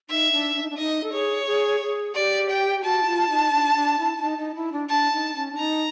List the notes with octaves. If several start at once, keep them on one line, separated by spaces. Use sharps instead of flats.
D#4 E5
D4
D4
D#4
D4
D#4 D#5
A4
G#4 C#5
G#4
G#4
G4 D5
G5
F#4 A5
E4
F4
D#4
D4
D4
E4
E4
D#4
D#4
E4
D4
D4 A5
D#4
C#4
D4
D#4 A#5